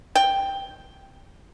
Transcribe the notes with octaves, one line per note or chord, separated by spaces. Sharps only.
G5